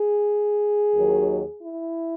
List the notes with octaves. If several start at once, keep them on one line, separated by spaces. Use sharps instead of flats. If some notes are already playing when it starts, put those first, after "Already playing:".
Already playing: G#4
D#2 D#3 F#3
E4